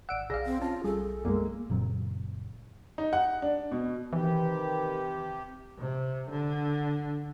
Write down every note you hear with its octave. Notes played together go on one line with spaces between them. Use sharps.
G#1 D5 F#5 E6 D7
B1 G#4 D5 F5 A#6
C4
C#4 F4 A5
B1 G3 G#4 A4
F#2 G#3 A#3
F#1 A#2 F#3 C4
D#4
F#5
D4
B2
C3 D#3 E3 G4 B4
C3
D3